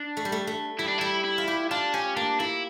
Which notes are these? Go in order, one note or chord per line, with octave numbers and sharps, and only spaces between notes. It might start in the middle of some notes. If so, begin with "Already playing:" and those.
Already playing: D4
A3
G3
A3
A3
G3 E4
D4
G3 E4
E4
F4
G4
D4 F4
C#4 G4
A#3 D4
A#3 E4